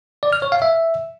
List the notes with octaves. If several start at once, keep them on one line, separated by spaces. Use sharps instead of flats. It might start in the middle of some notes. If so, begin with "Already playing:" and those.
D5
F6
C#5
F5
E5